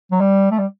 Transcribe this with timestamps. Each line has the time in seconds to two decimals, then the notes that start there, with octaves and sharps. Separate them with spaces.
0.12 F#3
0.20 G3
0.51 A3
0.59 G3